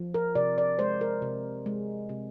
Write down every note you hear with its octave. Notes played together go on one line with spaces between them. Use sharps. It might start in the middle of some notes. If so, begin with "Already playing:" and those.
Already playing: F3
A#4
C3 D5
D5
G#3 C5
A#4
C3
G#3
C3